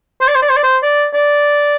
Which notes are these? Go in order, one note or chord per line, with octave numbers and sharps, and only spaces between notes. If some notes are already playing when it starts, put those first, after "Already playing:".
C5
D5
C5
D5
C5
D5
C5
D5
D5